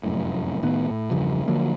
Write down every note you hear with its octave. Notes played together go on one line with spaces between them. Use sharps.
F1 F#2 A2
A2 D#3 B3
A2
E2 G2 C#3 F3
D3 F3 F#3 A#3